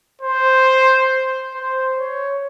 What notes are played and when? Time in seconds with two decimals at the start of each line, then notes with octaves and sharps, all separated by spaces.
0.21 C5
1.55 C5
1.99 C#5